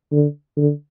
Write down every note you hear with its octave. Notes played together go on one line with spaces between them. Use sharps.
D3
D3